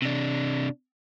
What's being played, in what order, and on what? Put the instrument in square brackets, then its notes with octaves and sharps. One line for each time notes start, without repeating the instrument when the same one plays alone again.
[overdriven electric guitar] C3 D4